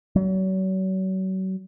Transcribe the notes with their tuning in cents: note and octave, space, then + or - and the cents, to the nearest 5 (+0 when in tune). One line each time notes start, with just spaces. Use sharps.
F#3 +35